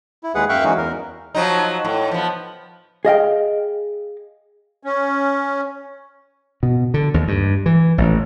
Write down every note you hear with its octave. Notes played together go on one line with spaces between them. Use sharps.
E4
D#2 G#3 G#4 B4 F#5
F#2 E5 F5 G5 C#6 F#6
E3 G#3 C#4 D#4 F#4
E2 A#4
F3 F#3 D#4
A2
F3 B3
G#4 D#5 F5 G5
C#4
B2
D3
D#2
G2
E3
A1